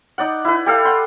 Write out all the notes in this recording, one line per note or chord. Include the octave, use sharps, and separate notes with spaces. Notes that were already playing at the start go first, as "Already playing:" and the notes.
D#4 D5 F#5
E4 B4
G4 A4 F5
F#5 C6